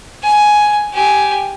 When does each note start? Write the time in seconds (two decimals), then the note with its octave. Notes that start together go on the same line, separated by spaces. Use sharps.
0.23 G#5
0.93 G4 G#5